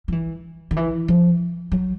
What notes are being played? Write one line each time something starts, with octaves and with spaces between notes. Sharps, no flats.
F3
E3
D#3
E3
F3
F#3